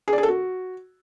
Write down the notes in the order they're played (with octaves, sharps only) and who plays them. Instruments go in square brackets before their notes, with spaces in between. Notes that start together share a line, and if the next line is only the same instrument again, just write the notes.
[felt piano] G#4
D5
G#4
A4
F#4